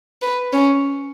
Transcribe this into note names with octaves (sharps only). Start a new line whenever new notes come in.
B4
C#4